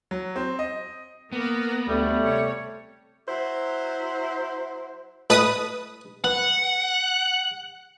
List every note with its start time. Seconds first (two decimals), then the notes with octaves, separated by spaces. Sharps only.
0.11 F#3
0.36 C4
0.59 D#5
1.32 A#3 B3 A#4
1.88 D2 G3 A3
2.23 C3 C#5
3.29 F#3 E4 C5
5.30 A2 B4 D#5 A5 D#6
6.24 B3 F#5